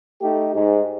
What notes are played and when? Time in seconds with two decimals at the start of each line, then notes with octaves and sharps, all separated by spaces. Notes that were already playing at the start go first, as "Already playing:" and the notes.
0.21 A3 D#4 G4
0.55 G#2